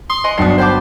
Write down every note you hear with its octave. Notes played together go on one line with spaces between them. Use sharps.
C6 D#6
C5 D#5 G#5 C6
G1 F#3 B3 D4 D#4 G5 D#6 C7
B4 C5 D5 F#5 G5 A5 D6